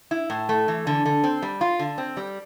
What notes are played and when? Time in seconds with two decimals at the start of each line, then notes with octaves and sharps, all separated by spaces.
0.11 E4
0.30 A2
0.49 A3
0.68 E3
0.87 D3
1.06 D3
1.24 C4
1.42 G3
1.61 F4
1.79 D3
1.98 C4
2.17 G3